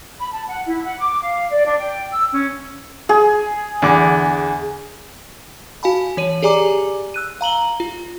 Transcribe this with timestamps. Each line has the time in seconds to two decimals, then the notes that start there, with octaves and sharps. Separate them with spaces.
0.18 B5
0.33 A5
0.47 F#5
0.66 E4
0.85 F#5
0.99 D6
1.23 F5
1.51 D5
1.66 D4
1.80 G5
2.10 E6
2.32 C#4
3.09 G#4
3.82 E2 D3 D6
5.83 F#4 F5 G#5 A5 B5
6.17 E3 C#5 D#7
6.42 G4 G#4 D5 G#5 A#5 D6
7.14 E6 F#6 D#7
7.41 F5 A#5 F#7 G7
7.80 F4